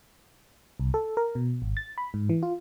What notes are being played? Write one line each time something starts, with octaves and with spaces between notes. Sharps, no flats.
C2
A4
A#4
B2
G#1
A6
B5
G#2
E3
F4